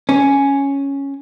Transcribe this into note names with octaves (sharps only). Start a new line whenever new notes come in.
C#4